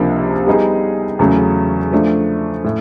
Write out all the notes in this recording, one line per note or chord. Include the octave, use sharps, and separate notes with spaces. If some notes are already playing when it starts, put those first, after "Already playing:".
Already playing: C#2 C3 F3 A#3 D4
G3 B3 D#4 G#4
E2 C#3 F#3 A3 C#4
F3 A3 D4
A2